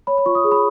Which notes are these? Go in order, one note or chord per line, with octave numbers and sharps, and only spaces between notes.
C#5 B5
B5
F4 C#6
D#6
G#4
B5